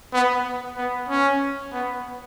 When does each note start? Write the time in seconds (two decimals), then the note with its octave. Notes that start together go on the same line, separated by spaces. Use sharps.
0.13 B3
0.76 B3
1.09 C#4
1.72 B3